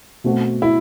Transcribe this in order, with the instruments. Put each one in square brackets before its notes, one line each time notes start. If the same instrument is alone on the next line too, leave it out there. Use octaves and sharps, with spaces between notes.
[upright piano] B2 A3 C4 F#4
[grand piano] E4